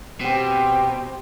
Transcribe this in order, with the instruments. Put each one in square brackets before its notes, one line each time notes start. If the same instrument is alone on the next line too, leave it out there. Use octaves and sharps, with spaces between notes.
[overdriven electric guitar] B2 [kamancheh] C4 G4